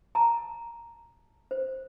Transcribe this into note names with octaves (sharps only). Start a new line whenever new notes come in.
A5 A#5
C5